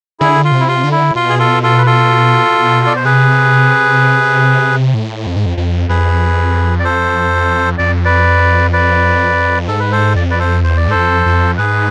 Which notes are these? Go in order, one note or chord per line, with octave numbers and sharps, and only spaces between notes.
D3 E4 G#4
F4
C3
E4
F4
D3
E4
A2
B2 F4
G#4
F4 A4
F4 A4
B4
F4 A4
D5
C5
C3 G#4 B4
A2
F2
G#2
F2
F2
F2 G#4 B4
D5
A4 C5
F2 D5
B4 D5
B4 D5
G#2 A4
B4
A4 C5
F2 D5
B4 D5
A4 C5
E2 C5
D5
G#2
F2 A4 C5
F2
G#2 G#4 B4